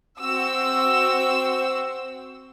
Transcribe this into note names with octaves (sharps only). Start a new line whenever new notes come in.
C4 F#4 E6